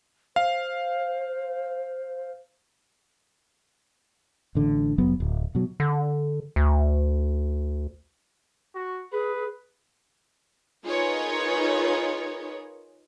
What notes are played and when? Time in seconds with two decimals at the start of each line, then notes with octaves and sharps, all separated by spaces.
0.36 C5 F5
4.55 A1 D3
4.98 F1 F#3 B3
5.20 D1
5.55 B2 F#3
5.80 D3
6.56 D2
8.75 F#4
9.12 G#4 B4
10.85 D#4 F4 G#4 A#4 B4 C#5